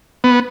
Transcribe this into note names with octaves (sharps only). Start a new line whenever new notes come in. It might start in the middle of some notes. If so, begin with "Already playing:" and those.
B3